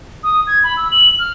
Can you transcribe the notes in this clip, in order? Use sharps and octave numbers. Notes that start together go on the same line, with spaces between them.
D#6
G#6
B5
E6
F#7
F6